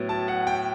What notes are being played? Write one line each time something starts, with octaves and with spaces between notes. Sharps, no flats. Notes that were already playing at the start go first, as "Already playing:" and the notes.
Already playing: A2 F#3 B3
A5
F#5
G5